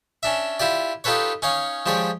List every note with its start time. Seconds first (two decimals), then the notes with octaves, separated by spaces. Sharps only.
0.23 C#4 D4 E5
0.60 E4 F4 G4 D5
1.04 D#4 F4 G4 A4 B4 C#5
1.42 C#4 D#4 C#5 F5
1.86 F3 G#3 G4 C#5 D5